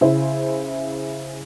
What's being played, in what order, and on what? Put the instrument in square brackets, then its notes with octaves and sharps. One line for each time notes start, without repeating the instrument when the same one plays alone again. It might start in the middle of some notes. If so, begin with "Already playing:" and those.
[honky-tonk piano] C#3 E4 C5